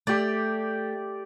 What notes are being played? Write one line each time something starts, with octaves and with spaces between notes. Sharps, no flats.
A3 G4 D5